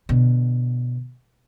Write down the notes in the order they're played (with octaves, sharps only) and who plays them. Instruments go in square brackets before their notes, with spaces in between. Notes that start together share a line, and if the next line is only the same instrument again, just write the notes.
[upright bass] B2 D3